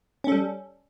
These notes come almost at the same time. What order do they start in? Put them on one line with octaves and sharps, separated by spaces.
C#4 A4 G3